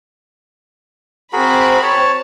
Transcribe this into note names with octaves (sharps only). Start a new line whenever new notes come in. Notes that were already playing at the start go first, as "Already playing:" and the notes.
C4 F#4 G#4 A#4 B5
C#5 A5